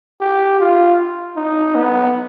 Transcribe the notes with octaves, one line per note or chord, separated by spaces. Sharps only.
G4
F4
D#4
B3